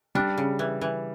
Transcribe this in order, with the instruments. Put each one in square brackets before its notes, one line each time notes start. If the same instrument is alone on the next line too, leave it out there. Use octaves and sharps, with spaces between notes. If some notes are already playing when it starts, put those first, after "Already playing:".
[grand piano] G3 [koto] D4
[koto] C#3
E3
E3